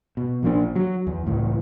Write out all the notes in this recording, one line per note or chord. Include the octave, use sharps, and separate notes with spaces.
B2
A#1 F3 A#3 D4
F#3
E2
C#2 A2 E3